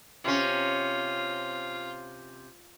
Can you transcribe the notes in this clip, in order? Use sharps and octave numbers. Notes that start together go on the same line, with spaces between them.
C3 C#4 F4